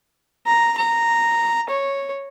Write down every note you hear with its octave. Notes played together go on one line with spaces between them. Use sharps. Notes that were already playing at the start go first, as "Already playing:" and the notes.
A#5
A#5
C#5